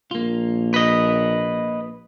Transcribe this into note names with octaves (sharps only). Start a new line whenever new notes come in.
A#1 A#3 F4
B4 D#5